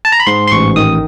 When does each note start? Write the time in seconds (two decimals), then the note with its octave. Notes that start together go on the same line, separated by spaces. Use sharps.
0.05 A5
0.12 A#5
0.20 B5
0.27 G#2 C6
0.48 C6
0.52 A1 C#6
0.76 D#3 D#6